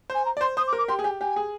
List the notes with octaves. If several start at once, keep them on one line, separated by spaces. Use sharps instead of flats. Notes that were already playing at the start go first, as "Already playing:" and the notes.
C5 G#5
A#5
D5
C5 C6
C5 D#6
D6
A#4
D6
G4 C6
G#4
G4 G#5
G4 G#5
G#4